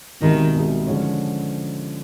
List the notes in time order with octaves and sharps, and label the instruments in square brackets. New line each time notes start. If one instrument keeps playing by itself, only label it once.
[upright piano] C2 B2 G#3 [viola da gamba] D#3
[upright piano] C2 B2 G#3
D3 F3 G#3 C#4